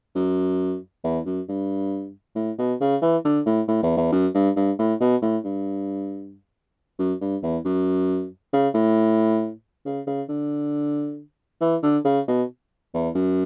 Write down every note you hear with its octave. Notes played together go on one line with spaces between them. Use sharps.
F#2
E2
F#2
G2
A2
B2
C#3
E3
D3
A2
A2
E2
E2
F#2
G2
G2
A2
B2
A2
G2
F#2
G2
E2
F#2
C#3
A2
C#3
C#3
D3
E3
D3
C#3
B2
E2
F#2